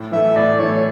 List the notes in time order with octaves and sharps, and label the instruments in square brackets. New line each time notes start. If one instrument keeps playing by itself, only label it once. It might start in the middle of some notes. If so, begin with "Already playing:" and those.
Already playing: [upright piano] A2
[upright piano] E3 A3 [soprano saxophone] E5
[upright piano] A2 [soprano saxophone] D5
[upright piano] E3 A3 [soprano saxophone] C#5